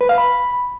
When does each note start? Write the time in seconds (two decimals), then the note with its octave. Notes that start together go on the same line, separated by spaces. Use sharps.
0.01 B4
0.09 F5
0.18 B5